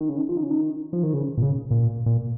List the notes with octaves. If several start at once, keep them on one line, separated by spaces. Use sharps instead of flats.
D#3
C#3
D#3
F3
D#3
C#3
D#3
F3
D#3
C#3
A#2
C#3
A#2
A#2